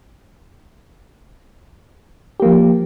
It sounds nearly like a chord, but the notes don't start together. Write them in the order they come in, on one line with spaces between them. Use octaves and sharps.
G4 A#3 F3